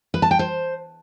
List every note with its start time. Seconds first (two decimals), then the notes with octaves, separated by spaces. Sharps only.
0.14 B4
0.22 A5
0.31 G5
0.39 C5